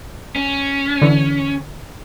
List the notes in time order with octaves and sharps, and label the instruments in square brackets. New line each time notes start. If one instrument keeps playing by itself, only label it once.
[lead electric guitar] C#4
[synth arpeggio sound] D3 E3